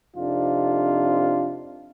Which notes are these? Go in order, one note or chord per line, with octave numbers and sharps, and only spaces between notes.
F2 C3 D4 D#4 F4